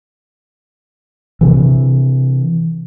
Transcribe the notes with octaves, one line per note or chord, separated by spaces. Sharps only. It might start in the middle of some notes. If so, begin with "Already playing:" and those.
C3 E3